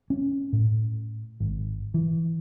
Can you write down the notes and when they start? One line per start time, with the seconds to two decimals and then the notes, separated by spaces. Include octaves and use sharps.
0.10 C#4
0.53 A2
1.40 G#1
1.94 E3